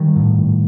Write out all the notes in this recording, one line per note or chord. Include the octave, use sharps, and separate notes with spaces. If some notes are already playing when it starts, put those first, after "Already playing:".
Already playing: D#3 G3
A2
A2